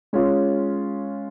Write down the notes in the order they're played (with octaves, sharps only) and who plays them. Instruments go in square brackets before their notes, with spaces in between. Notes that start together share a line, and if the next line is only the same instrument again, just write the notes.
[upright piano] G#3 C#4 F4